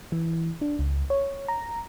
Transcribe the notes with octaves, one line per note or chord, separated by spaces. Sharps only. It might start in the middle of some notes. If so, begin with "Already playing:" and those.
E3
D4
C#2
C#5
A#5